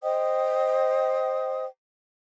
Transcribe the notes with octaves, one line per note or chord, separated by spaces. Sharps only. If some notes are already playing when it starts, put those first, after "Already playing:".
C5 D#5 G5 D#6